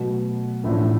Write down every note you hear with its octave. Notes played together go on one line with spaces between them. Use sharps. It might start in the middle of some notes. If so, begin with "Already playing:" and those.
Already playing: B2 F#3 A3
A1 A2 F3 A3 D4